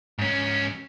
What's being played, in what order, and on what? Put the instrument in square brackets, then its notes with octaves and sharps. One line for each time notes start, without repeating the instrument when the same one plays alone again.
[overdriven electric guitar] G#2 C#4